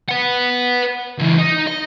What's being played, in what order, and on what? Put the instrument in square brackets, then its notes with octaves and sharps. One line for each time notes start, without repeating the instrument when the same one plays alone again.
[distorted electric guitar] B4 F#5
C#2 E3
D#4
D#5